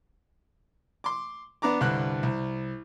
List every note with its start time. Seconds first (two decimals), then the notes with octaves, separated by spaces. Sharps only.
1.04 C6 D6
1.62 B3 D4 B4 A#5 D6
1.81 C2 G2 D3 F#6
2.23 C2